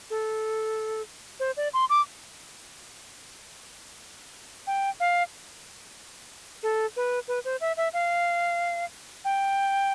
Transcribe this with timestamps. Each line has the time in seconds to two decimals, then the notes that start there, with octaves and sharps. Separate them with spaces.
0.10 A4
1.40 C5
1.57 D5
1.74 C6
1.90 D6
4.67 G5
5.00 F5
6.63 A4
6.96 B4
7.28 B4
7.45 C5
7.61 E5
7.77 E5
7.93 F5
9.25 G5